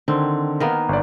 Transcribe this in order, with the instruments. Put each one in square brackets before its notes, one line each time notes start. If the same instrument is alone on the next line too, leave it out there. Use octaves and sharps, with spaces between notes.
[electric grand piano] D3 D#3 [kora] C4
[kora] D#3 A#3 B3
[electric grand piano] G1 D5